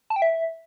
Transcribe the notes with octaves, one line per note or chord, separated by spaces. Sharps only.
A5
G5
E5